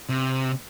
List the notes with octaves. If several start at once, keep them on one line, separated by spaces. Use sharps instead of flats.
C3